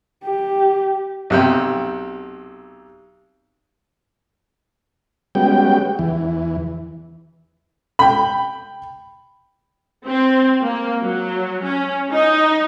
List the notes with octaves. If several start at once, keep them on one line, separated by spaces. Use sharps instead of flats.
G4
B1 C3 G5
G3 G#3 B3 C#4 F#4 G5
E2 E3
G5 B5
C4
A#3
F#3
C#4
D#4